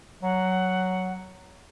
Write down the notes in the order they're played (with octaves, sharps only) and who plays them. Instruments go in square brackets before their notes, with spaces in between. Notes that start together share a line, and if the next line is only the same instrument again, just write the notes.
[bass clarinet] F#3 [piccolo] F#5